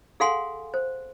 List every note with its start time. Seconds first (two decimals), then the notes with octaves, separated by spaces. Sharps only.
0.20 G#4 A4 F5 F#5 G#5 C6
0.74 C5